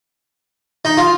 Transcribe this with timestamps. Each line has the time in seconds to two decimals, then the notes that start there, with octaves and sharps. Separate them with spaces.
0.85 D#4
0.97 F4